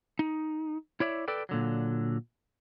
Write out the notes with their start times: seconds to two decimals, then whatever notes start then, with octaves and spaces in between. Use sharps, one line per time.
0.19 D#4
1.00 E4 C#5 D5 E5
1.28 A4 B4 D5 G5
1.49 A#2 D3 F#3